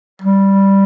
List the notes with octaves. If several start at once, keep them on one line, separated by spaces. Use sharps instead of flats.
G3